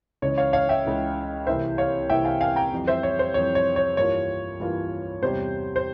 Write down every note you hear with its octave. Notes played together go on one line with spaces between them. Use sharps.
C#2 C#3 E3 C#5
C#5 F5
C#5 F5
E5 G5
C#2 C#3 E3
C2 C3 E3 A#3 E4 C5 E5
C#5 F5
C2 C3 E3 A#3 E4 E5 G5
F5 G#5
F5 G#5
G5 A#5
F2 E3 G3
C5 E5
C#5
C5
F2 E3 G3 C#5
C#5
C#5
G2 E3 A#3 F4 C#5
G2 E3 A#3 F4
E2 C3 G3 C5
C5